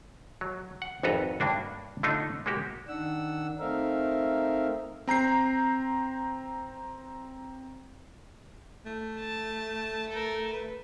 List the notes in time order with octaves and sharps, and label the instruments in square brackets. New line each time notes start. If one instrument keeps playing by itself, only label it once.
[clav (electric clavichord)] F#3
F#5
G#1 F2 F#4 A4 B4 A#5
G2 A#3 D4 F#4
D3 A3 D4 D#4 F4
G#3 A#3 F#4 G4
[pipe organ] D#3 D4 F#5 E6
A3 C4 D#4 A#4 E5 F5
[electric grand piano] C4 A#5 G6 C7
[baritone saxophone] A3
[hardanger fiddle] A5
A4 A#4
B4